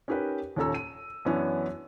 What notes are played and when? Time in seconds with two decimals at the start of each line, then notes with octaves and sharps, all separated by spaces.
0.08 C#4 D#4 G4 A#4 B4
0.56 D#2 A#2 C#4 A4 A#5 E6
0.74 D#7
1.25 F#2 E3 B3 C#4 D4 E4